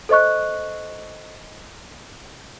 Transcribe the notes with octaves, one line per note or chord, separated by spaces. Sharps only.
A4 C5 D#5 C#6 F#6